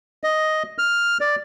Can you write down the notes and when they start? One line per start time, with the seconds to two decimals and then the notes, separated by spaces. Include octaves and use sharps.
0.24 D#5
0.78 F6
1.21 D5